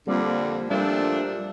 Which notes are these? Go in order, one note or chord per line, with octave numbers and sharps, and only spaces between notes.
F2 D3 F3 G3 A#3 C4
A#2 F3 G3 A3 D4